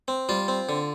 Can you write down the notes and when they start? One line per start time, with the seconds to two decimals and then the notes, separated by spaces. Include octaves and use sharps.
0.08 C4
0.29 G3 F4
0.48 C4
0.69 D3